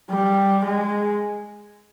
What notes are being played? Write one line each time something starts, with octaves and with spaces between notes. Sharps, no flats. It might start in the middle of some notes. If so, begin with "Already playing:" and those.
G3
G#3